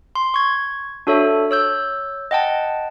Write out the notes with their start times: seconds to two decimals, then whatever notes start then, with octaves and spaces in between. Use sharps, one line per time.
0.15 C6
0.34 C#6 G#6
1.07 D4 F#4 A4 C#5 E5
1.51 C#5 E6 G6
2.31 D#5 F#5 G5 A5